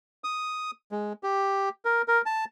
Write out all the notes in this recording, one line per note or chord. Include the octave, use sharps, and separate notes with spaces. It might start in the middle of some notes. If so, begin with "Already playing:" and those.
D#6
G#3
G4
A#4
A#4
A5